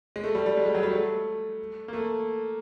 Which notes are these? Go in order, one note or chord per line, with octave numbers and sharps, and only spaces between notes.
G#3
A3
G3
G3
G#3
G3
F#3
G3
A3
A#3
A3